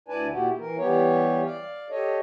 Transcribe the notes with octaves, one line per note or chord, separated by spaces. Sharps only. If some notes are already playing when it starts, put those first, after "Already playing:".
D2 E4 B4 D5 G#5 A5
A#2 E4 F#4 G4
E3 A#4
E3 G3 B3 G4 C#5
D5 F5
G4 A4 C#5 D#5